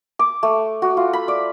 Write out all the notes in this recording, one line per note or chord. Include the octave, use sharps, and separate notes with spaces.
D6
A3
F#4
F4
B5
D5